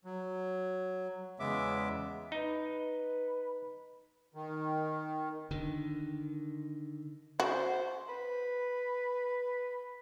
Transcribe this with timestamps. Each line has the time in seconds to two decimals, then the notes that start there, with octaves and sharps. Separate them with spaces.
0.05 F#3
1.40 E2 C#3 G#3 B3 E5 D6
2.32 D#4 B4
4.35 D#3
5.51 D3 D#3
7.40 F#4 C5
8.09 B4